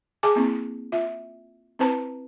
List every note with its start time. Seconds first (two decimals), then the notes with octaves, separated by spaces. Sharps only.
0.23 G#4 G#5 A5 D6
0.36 A#3 C4 E4
0.92 F4 E5
1.79 C4 E4 B4 C5 A5 A#5